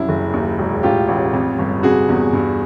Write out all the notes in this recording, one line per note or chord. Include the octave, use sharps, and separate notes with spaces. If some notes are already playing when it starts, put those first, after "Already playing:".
Already playing: C2 F#2 E4
F#1
D#2
E1
A2 F4 G4
A1
F2
G1
C3 F#4 G#4
E2
G2